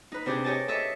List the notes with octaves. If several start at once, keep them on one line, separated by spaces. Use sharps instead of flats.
D#4 B4
C3 D4 G4 G#4
G4 C#5 D#5 G#5 A5
A4 D#5 E5 C#6